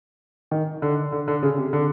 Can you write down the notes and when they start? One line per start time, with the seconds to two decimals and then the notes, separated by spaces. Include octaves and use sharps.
0.51 D#3
0.82 D3
1.12 D3
1.28 D3
1.43 C#3
1.58 C3
1.73 D3